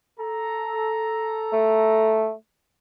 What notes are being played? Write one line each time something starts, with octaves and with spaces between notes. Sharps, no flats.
A4 A#5
A3